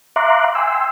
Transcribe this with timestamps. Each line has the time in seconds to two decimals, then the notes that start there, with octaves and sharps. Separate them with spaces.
0.16 E5 F5 A#5 C6 D6 F#6
0.55 G5 G#5 C6 E6